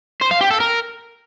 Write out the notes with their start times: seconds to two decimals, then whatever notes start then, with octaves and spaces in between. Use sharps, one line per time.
0.21 C5
0.31 F5
0.41 G4
0.50 A4
0.60 A#4